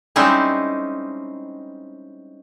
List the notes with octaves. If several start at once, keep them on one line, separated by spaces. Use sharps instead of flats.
G3 G#3 C4 C#4 D#4 E4